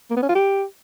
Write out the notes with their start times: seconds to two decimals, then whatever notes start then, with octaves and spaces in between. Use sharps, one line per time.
0.11 A#3
0.17 B3
0.23 C#4
0.29 F4
0.35 G4